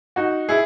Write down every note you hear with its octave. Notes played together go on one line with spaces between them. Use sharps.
D#4 F#4
E4 G#4